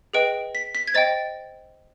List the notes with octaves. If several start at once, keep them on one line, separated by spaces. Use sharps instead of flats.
G#4 B4 D#5 G5 D7
B6
B6
G#6
C5 D#5 G5 A6